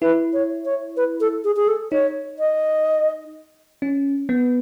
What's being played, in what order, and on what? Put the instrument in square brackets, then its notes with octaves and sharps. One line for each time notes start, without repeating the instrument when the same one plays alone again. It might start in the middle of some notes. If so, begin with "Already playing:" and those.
[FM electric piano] E4 [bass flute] B4
[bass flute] C#5
C#5
B4
A4
G#4
G#4
A4
[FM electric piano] D#4 [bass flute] C#5
[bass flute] D#5
[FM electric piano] C#4
B3